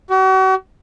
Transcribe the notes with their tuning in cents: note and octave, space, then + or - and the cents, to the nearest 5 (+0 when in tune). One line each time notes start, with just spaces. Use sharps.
F#4 +40